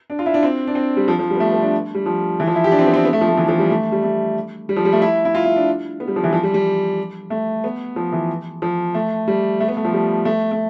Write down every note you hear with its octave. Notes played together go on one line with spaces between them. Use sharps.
D4
F4
E4
D4
C4
D4
C4
G3
F3
F3
G3
B3
A3
B3
D4
G3
F3
E3
F3
E4
G4
D4
C4
B3
C4
B3
A3
F3
A3
E3
F3
G3
A3
G3
A3
G3
F3
G3
A3
E4
E4
F4
E4
D4
B3
G3
F3
E3
F3
G3
G3
A3
B3
F3
E3
F3
A3
G3
A3
B3
A3
F3
G3
A3
A3